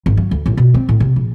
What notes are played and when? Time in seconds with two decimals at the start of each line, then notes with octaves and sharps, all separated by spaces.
0.06 G#1
0.17 F#3
0.31 D2
0.46 A1
0.57 B2
0.74 C4
0.89 A2
1.00 C3
1.16 A#1